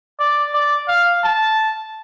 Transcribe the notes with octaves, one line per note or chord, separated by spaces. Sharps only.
D5
D5
F5
A5